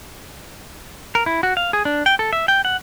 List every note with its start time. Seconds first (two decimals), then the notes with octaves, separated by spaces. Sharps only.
1.15 A#4
1.26 E4
1.43 F#4
1.57 F5
1.73 G#4
1.85 D4
2.06 G5
2.19 A4
2.33 E5
2.48 G5
2.65 F#5